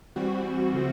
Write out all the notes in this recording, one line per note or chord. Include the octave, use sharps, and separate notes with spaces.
E3 G3 C4 F#4
C#3 F3 A3 C4